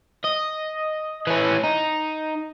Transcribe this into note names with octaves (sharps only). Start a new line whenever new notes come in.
D#5
E3 C#4
D#4